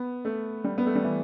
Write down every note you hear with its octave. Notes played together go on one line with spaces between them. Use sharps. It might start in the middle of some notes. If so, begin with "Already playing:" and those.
Already playing: B3
A3
G3
B3
A3
G3
E3